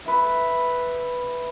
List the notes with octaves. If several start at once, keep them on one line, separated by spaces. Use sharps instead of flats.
B4 E5